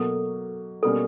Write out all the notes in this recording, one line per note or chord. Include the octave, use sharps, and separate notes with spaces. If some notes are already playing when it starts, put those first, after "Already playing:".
Already playing: B2 F#3 A#3 A4
B2 G3 A#3 C#4 A4